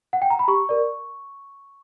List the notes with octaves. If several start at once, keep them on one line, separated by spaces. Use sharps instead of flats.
F#5
G5
A#5
B5
G4 C#6
A#4 D5